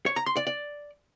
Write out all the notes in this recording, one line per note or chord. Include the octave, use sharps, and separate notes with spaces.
C#5
A#5
C6
D5
D5